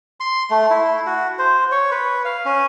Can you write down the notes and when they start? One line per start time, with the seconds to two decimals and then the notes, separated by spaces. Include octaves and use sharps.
0.20 C6
0.50 A3
0.70 E4
1.06 F#4
1.39 C5
1.72 C#5
1.91 B4
2.25 F5
2.45 C#4